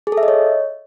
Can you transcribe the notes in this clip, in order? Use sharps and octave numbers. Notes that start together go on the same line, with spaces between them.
G#4
A4
E5
D#5
C#5